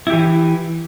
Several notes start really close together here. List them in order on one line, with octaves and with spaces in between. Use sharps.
E4 G4 E3